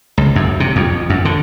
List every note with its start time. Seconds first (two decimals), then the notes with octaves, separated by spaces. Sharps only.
0.18 C#2
0.36 F#2
0.60 C3
0.76 F2
1.10 F#2
1.25 D3